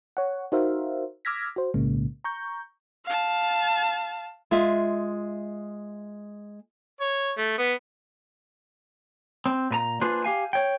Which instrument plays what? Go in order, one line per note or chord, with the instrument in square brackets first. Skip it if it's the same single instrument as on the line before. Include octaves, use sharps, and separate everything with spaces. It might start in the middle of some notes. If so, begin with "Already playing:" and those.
[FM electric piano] C#5 F#5
D#4 F#4 A#4 C5 E5 F5
D6 E6 F6 G#6 A#6 B6
F#4 C5
B1 A2 C#3 G#3 A#3
A#5 C#6 G6
[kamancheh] F5 A5
[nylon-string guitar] G#3 F4 E5
[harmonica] C#5
A3
B3
[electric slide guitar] C4
A#2 B4 A#5
A#3 D4 F4 G#4 B4 C5
G4 F5 G#5
C#5 G5